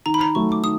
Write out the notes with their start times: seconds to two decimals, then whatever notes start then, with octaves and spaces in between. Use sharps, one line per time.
0.06 D#3 A#5
0.14 B5
0.21 A#5
0.35 F#3 A3 C#6
0.52 D6
0.63 D#3 D#6